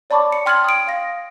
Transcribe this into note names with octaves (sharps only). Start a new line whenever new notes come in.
C#5 D5 A5 B5 C#6 D6
C#7
G5 C6 F6 G#6 A6 F#7
D#6 D7
F5 A#6